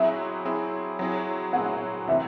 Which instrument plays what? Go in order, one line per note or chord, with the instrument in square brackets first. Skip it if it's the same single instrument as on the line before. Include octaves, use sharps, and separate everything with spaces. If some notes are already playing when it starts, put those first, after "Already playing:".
Already playing: [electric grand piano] F#3 C4 E4 G#4 [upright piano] E5
[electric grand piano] F#3 C4 E4 G#4
F#3 C4 E4 G#4
[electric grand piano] F#3 C4 E4 G#4 [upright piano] F#5
[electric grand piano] C3 E3 C4 [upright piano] E5